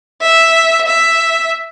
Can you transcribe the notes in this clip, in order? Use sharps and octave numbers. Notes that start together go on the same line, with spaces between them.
E5
E5